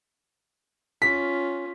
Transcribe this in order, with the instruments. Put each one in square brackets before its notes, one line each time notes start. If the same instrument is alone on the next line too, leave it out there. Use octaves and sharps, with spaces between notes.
[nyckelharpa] C#4 F4 [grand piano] B6